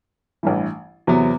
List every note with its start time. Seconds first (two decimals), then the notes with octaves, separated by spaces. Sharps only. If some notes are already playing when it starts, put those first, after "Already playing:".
0.43 A1 G2 E3
1.07 E2 C3 F#3 B3